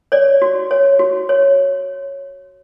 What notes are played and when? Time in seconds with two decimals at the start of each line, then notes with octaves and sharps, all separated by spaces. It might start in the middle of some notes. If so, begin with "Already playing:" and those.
0.12 C#5 D5
0.42 F#4
0.71 C#5
0.99 F#4
1.29 C#5